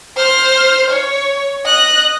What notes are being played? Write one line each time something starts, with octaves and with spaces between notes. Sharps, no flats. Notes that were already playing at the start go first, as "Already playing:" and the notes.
C5 F6
C#5
D#5 F#6